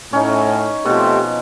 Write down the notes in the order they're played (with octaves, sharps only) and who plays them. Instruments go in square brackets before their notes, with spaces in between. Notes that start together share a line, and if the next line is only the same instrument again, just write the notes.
[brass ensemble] A2 [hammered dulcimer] C#4 D#4
[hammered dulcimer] B2 F3 [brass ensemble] A3 C4 G4